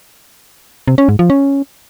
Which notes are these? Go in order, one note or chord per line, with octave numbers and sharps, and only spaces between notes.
C3
C#4
G#2
F3
C#4